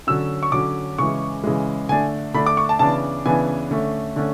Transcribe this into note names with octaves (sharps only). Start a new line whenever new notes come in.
D3 F#3 C#4 E6
C#6
D3 F#3 C#4 D6
C#3 E3 G#3 C#6
C#3 E3 G#3
D3 A3 D4 G#5
D3 A3 D4 B5
D6
C#6
A5
C#3 E3 B3 D4 A5
C#3 E3 B3 D4 G#5
D3 A3 C#4
D3 A3 C#4